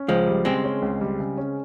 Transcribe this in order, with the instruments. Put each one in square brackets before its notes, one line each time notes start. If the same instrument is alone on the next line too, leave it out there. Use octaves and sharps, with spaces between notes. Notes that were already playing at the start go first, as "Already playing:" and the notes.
Already playing: [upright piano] C#4
[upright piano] C#2 [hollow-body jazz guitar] F3 G#3
[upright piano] G3
[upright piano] C#3 [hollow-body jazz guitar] G#3 C4
[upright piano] C#4
C#2
G3
C#3
C#4